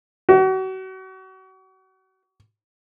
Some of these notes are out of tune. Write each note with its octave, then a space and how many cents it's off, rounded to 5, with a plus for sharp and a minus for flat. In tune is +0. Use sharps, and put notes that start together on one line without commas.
F#4 +35